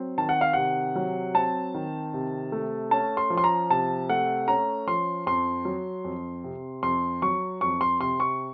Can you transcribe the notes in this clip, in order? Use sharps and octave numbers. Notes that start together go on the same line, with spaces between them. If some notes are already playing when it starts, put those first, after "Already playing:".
Already playing: F#3 C4
D#3 A5
F#5
F5
C3 F#5
F#3
C4 A5
D#3
C3
A3
C#4 A5
C6
F3
C6
A#5
C3 A5
A3 F#5
C#4 A#5
F3 C6
F2 C6
F#3
F2
C3
F2 C6
F#3 C#6
F2 C#6
C6
C3 C6
C#6